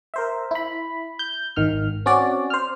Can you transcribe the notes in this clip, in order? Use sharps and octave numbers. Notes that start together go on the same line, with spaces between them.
A#4 C5 E5
E4 B5
G6
G#1 D#3 F6
C4 C#4 F#4 D5
C5 F6